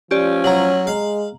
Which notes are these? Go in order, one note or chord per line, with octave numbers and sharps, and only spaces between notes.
F3 C#4 G4 D5
F#3 A#5 F#7
G#3 F5